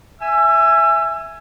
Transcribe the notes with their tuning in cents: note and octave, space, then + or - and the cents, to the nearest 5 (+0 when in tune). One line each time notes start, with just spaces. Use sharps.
E5 +0 G#5 +0 E6 +30